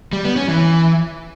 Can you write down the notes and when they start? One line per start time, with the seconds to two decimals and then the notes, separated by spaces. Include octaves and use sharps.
0.13 G3
0.24 B3
0.36 C#4
0.48 E3